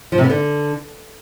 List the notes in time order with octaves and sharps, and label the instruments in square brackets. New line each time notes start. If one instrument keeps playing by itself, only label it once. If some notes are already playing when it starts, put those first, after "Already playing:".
[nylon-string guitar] F3
C3
B3
D3